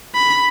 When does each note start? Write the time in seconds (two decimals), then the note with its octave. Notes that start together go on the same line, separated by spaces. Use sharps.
0.15 B5